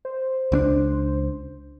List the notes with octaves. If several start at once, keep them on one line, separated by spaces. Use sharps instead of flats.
C5
C#2 C4 D4